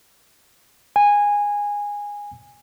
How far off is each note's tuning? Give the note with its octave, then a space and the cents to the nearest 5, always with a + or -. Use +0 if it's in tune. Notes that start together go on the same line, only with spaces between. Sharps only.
G#5 -15